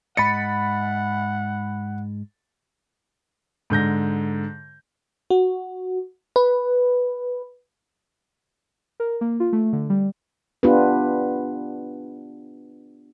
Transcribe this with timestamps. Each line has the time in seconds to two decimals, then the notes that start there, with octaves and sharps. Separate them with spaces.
0.17 G#2 D#5 F#5 B5 A6 C#7
3.70 G#2 D3 G6 A#6
5.30 F#4
6.36 B4
9.00 A#4
9.21 A#3
9.40 F4
9.53 A3
9.73 D3
9.90 G3
10.63 B3 D4 F4 G4 B4